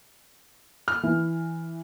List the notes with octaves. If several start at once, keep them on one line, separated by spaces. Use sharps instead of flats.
F6
E3